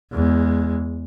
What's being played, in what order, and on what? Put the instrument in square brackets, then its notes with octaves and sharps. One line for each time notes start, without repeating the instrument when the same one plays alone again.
[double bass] E2 G#3